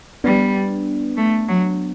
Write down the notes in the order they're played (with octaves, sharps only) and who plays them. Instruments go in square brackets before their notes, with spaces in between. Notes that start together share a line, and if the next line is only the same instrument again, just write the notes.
[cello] G3 [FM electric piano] B3 D4
[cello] A3
F#3